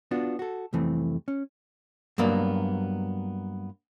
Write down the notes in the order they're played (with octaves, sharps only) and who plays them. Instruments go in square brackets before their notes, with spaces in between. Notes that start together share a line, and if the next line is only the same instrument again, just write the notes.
[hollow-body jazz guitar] B3 D4 F4 F#4
F#4 A4
C2 F2 E3 A3 C4
C#4
G2 F#3 A#3 B3 D5